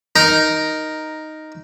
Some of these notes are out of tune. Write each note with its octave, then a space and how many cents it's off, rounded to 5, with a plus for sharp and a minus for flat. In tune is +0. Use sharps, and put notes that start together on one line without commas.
D#4 +0 A#4 +5